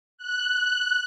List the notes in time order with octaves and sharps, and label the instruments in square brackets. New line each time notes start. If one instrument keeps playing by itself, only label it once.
[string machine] F#6